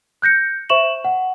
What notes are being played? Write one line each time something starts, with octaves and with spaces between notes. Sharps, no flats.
F#6 G6 A#6 C#7
C5 E5 C#6 E7 F#7
F#5